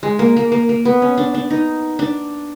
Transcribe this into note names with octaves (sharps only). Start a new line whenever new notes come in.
G#3
A#3
A#3
A#3
A#3
B3
C#4
D4
D4
D#4
D4